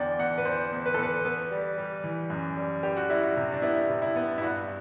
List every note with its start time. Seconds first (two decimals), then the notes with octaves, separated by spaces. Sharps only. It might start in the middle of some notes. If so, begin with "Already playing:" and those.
Already playing: E2 D3 D5 G5
0.19 E2 F#5
0.38 B4
0.45 E2 C5
0.72 E2
0.86 B4
0.94 A4
0.99 E2 B4
1.25 B3 B4
1.51 G3
1.78 G3
2.04 E3
2.30 F#2
2.56 G3
2.83 G3 G4
2.97 F#4
3.09 G3 E4
3.23 F#4
3.37 C3
3.52 D4
3.62 B3 E4
3.90 C3
4.02 E4
4.16 B3
4.38 E4
4.42 G2 F#4